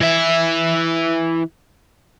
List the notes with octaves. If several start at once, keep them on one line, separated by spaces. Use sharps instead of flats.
E3 E5